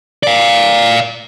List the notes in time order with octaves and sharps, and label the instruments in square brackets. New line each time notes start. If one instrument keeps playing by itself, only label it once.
[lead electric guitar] D5 F5